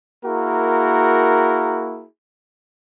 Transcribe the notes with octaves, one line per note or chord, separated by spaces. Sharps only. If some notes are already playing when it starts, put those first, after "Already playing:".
A#3 E4 F#4 G#4 A#4